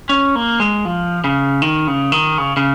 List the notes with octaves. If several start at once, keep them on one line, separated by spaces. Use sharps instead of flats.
C#4
A#3
G#3
F3
C#3
D#3
C#3
D#3
C#3
C#3